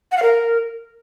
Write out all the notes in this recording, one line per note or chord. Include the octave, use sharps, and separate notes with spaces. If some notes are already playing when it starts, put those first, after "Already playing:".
F#5
F5
A#4